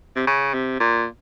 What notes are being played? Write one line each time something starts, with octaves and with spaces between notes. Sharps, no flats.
C3
C#3
C3
A#2